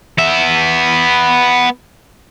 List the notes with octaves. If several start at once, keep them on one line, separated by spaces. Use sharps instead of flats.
B3 E5